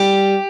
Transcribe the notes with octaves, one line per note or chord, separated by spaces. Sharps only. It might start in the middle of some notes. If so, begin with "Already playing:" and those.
Already playing: G3 G4